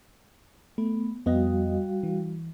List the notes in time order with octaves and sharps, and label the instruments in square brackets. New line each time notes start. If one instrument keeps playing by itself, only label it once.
[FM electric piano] A3 [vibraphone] B3
[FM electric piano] F2 B3 D#5 [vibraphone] G3 F#4 F5
[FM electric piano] E3